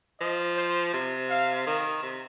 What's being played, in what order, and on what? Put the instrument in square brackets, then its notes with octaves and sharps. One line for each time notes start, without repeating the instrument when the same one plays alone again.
[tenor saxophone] F3 [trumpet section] D#5
[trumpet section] C5
[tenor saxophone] C3
[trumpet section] F5
[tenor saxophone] D#3
C3